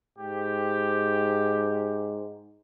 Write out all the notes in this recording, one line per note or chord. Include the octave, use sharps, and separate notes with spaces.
G#2 G4